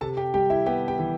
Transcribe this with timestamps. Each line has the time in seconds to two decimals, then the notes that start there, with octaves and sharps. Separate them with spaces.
0.01 C3 A4 A5
0.17 G4 G5
0.34 G3 G4 G5
0.50 E4 E5
0.66 B3 G4 G5
0.88 G4 G5
0.99 E3